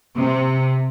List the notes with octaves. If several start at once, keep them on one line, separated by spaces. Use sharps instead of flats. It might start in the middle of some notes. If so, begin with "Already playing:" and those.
C3